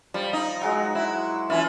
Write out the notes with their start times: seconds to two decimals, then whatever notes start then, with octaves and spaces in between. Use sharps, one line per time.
0.14 F3 G3
0.33 D#4
0.61 F#3 G#3 F#4
0.95 E4
1.50 E3 C#4 E4 F4